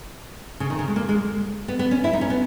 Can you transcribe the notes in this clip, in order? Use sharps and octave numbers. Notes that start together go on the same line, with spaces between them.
C#3
D#3
C#3
G#3
A#3
G#3
B3
B3
C#4
E4
D#4
C#4
B3